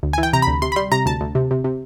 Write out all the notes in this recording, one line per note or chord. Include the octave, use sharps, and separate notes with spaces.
D2
G#5
E3
G5
C3 A#5
B5
D2
C3 C6
B5
G3 C6
C3 A#5
D2 A5
D2
C3
C3
C3